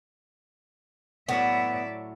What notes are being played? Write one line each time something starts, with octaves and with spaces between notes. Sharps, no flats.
A2 F#3 B3 E4 D5 E5